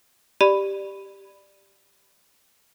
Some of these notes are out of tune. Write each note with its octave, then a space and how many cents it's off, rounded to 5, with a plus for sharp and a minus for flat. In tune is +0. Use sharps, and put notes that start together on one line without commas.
G4 +0 D5 +10 B5 +5